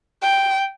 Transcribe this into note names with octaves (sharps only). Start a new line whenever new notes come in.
G5